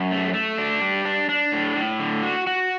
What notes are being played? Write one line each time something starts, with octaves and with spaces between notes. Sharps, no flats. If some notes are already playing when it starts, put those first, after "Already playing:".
Already playing: F#2
A3
A3
D4
G3
D4
D4
A2
A2
D3
F#4
F#4